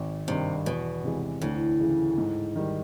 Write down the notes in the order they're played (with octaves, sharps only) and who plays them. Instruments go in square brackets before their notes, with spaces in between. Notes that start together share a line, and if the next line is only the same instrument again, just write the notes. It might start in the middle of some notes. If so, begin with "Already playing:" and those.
Already playing: [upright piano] G#1
[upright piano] G2 D#3 [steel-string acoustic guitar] C3
[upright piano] E2 [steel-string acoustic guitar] B2
[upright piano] C3 E3 G#3
[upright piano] D2 [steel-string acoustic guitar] A2
[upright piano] C#3 E3
G#2
D#3 G3